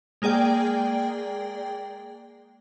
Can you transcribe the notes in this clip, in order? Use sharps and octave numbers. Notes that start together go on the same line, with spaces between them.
G#3 A#3 G#4 D5 G5